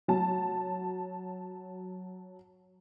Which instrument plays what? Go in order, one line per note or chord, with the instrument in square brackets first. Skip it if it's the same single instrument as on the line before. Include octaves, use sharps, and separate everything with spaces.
[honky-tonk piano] F#3 A5